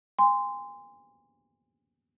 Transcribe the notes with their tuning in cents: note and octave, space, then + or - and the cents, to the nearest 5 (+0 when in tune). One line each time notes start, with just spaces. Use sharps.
G#5 -35 C6 -15